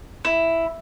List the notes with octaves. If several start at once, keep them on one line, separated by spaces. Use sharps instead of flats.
E4